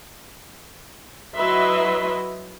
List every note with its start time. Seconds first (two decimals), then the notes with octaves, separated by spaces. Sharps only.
1.37 F#3 E4 B4 D#5 E5 C6